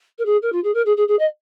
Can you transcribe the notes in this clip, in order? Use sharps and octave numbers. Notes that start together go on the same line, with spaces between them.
A#4
G#4
A#4
F4
G#4
A#4
G#4
G#4
G#4
D#5